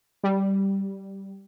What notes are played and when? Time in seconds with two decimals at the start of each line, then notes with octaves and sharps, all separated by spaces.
0.23 G3